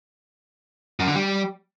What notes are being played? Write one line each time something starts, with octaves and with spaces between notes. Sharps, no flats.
F#2
D3
G3